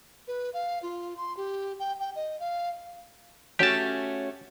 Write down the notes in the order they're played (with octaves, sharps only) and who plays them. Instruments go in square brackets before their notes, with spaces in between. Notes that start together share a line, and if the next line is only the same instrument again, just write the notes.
[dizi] B4
F5
F4
C6
G4
G5
G5
D#5
F5
[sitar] A3 C#4 F#4 [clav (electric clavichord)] G4 A5